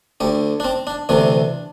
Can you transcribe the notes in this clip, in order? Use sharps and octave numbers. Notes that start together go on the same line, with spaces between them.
D2 D3 G4
D4
C4
D4
D2 C3 E3 D4